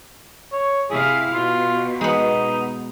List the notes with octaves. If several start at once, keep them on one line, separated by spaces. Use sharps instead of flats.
C#5
C3 E4 G#4 F5
B2 F4
G#3 B3 D#4